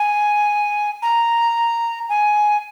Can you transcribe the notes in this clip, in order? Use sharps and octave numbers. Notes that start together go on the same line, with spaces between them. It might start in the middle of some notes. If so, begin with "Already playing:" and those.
Already playing: G#5
A#5
G#5